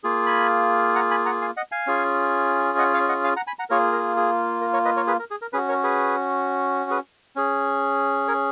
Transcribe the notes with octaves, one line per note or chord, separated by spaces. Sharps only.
A#3 F4 G#4
G#5 B5
F#5 A#5
G#5 B5
F#5 A#5
F5 G#5
D#5 F#5
F5 G#5
C#4 F4 G#4
D#5 F#5
C#5 F5
D#5 F#5
F5 G#5
F#5 A#5
G#5 B5
F#5 A#5
A#3 F4 G#4 A#4 C#5
A#4
G#4
A#4
A#4 C#5
B4 D#5
A#4 C#5
G#4 B4
A#4
G#4
A#4
C#4 F#4 G#4 B4
A#4 C#5
G#4 B4
G#4 B4
C#4 G#4
A#4 C#5